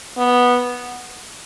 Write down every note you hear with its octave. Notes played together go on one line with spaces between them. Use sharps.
B3